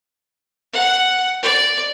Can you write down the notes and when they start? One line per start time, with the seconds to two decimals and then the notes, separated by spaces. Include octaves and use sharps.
0.73 F#5
1.42 D5